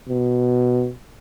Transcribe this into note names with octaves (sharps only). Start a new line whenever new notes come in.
B2